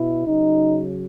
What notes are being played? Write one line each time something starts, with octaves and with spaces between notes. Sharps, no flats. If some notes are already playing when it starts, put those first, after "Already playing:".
Already playing: B2 E4
C#3 F#3 D#4